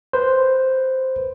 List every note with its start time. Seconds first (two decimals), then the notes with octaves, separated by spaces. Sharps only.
0.13 B4 C5